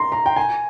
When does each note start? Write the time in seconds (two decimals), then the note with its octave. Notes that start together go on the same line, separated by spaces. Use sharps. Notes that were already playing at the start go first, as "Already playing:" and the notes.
Already playing: A#5 C6
0.12 A#5
0.26 G5
0.36 G#5